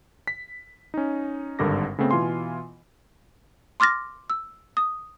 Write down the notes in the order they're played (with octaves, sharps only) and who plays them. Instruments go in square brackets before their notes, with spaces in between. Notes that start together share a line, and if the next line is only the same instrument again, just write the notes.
[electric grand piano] B6
C#4 D#4
G#1 G2 D3 A#4 D6 A#6
C#3 A3 B3 C4
B2 E3 F4 G#5 C6
[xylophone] C6 D6 F6 A6 A#6
E6
D#6